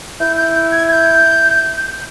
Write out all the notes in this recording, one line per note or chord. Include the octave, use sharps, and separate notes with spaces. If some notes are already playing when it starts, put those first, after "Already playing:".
E4 G6
G6
G6
G#6
G#6
G6